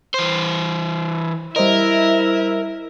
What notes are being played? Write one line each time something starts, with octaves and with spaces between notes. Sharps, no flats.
E3 C5
G3 E4 A#4 C5 D#5 E5